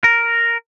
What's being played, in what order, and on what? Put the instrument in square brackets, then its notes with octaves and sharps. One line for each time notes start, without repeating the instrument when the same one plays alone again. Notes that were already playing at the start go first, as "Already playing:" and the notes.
[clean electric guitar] A#4